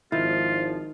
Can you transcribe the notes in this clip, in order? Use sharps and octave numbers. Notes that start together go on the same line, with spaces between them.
G#1 D#3 F3 E4 F4